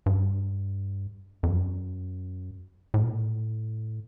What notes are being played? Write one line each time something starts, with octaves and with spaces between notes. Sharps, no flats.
G2
F2
F#2
A2
A#2
A2